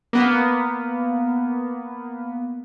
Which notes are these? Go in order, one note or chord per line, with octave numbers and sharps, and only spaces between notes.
A#3 B3